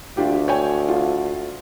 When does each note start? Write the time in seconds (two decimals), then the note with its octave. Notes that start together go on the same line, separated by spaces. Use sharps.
0.17 D2 D4 F4 G4
0.48 C#5 G5 G#5
0.88 F4